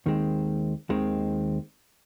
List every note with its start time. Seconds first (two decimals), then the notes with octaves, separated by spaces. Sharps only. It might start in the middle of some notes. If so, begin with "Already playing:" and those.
0.06 D#2 D#3 G#3 C4
0.90 D#2 D#3 G#3 C4